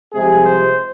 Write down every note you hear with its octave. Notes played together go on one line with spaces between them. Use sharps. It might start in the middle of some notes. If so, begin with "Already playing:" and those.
C2 C3 F3 G#3 G#4
C5